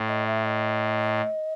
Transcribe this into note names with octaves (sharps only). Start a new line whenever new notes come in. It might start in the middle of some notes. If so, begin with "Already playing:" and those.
Already playing: A2
D#5
E5
D#5